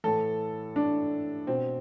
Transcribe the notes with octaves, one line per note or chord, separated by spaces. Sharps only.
A2 E3 A4
D4
B2 C4